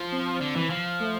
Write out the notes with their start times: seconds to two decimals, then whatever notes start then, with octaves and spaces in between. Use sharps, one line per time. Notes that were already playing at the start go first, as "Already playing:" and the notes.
Already playing: F3
0.12 C4
0.41 D3
0.56 E3
0.70 F3
1.00 A3